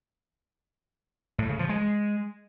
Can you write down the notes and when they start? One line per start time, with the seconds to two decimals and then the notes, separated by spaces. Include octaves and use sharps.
1.38 A2
1.49 C#3
1.59 F3
1.69 G#3